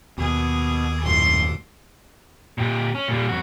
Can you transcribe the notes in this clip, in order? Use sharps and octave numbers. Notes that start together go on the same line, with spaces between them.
D#2 B2 D#3 G#4
D#1 F#2 A2 C6
A#2 G4
C#4
A#2 G3
F2 F#4